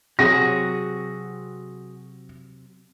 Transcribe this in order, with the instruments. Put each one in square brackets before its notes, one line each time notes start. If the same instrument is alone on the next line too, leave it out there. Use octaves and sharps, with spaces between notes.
[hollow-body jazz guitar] C3 F#3 [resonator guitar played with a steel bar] F#4 G#4 [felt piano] A#6